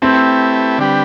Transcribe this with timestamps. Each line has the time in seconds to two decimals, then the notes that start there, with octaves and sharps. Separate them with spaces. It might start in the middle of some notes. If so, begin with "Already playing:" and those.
0.02 A3 C4 E4 G4 B4
0.78 D3 G3 D4 G4 B4